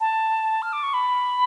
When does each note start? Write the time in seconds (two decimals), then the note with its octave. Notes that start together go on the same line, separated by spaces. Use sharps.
0.01 A5
0.62 F6
0.73 D6
0.83 C#6
0.94 B5